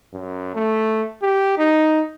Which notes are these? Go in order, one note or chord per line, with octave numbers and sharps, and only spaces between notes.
F#2
A3
G4
D#4